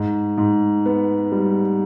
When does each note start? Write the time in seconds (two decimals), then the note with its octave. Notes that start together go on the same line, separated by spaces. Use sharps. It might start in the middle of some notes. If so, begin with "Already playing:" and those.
Already playing: G#2
0.38 G#2
0.86 B3
1.32 G3